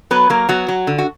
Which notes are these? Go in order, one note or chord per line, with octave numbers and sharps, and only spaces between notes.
F#3 B3 B4
F#3 A#3 A#4
F#3 B3 F#4
F#3
D3
F#4